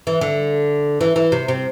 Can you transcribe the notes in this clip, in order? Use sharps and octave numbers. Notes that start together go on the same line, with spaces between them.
E3
D3
E3
E3
C3
C3